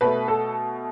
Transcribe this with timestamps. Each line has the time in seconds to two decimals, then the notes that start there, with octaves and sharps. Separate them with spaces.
0.01 B2 A3 B4
0.28 A4